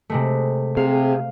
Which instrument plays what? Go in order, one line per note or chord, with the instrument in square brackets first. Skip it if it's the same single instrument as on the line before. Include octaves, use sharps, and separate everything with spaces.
[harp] C3 G#3 A3
[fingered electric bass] C3 [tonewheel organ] G#4 [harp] F5